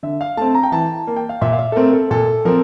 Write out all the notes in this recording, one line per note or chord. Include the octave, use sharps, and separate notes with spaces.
D3 E5
F5
A3 C4 A5
A#5
G5
E3 A5
A#3
G5
F5
A#2 E5
F5
E5
A4
A3 C4 A#4
A4
A#2 A4
F3 C4 A#4